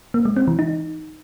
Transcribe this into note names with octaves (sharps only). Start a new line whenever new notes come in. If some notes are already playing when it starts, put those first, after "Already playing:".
A#3
G#3
C4
E3
D#4